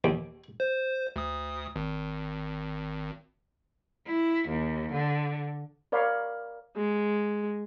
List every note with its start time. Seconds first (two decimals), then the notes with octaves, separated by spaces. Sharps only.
0.04 D#2
0.60 C5
1.16 D2 D#6
1.76 G#1
4.07 E4
4.48 D#2
4.93 D3
5.92 A#4 C#5 D5 F5 B5
6.76 G#3